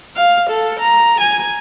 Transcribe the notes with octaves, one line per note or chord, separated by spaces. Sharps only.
F5
A4
A#5
G#5